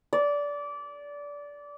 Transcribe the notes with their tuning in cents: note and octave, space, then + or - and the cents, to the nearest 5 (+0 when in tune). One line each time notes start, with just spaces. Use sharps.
D5 -20